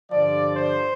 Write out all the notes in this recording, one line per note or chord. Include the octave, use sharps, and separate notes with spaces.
G2 D3 F3 D5
C5